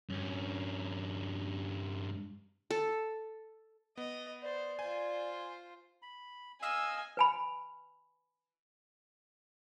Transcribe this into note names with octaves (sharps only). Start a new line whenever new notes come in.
G2 C#4
A4
B3 D#5
C5 D5
F4 C5 G#5
B5
D#5 F5 G#5 E6
B4 G#5 B5